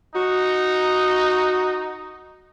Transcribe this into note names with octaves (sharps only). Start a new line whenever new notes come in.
D#4 F#4